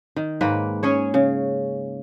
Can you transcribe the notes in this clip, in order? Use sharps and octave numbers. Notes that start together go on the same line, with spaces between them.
D#3
G#2 A#3 B4
C#4 G#4 C#5
C#3